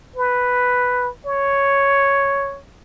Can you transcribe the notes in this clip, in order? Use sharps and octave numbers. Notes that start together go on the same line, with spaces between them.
B4
C#5